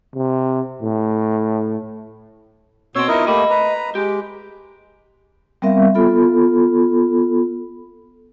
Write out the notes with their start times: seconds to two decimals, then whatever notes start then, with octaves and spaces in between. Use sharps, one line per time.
0.15 C3
0.82 A2
2.96 B2 C4 C5 C#5 E6
3.08 F3 B3 D#4 E4 A#4 D#5
3.27 A3 A#3 G4 D#5 B5
3.50 B4 A#5
3.95 G#3 G4
5.62 G3 B3 C4 A#4 E5 F5
5.95 B3 F4 A4 B5